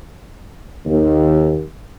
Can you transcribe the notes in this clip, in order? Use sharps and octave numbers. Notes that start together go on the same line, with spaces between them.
D#2